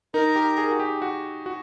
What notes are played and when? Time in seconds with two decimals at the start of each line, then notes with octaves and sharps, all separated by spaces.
0.14 D#4 A#4
0.36 G4
0.58 G#4
0.71 F#4
0.80 G4
1.02 F#4
1.46 F#4